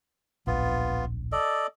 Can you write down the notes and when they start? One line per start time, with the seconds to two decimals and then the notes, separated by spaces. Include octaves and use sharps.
0.47 D1 A#1 B3 F4
1.32 A4 D5 D#5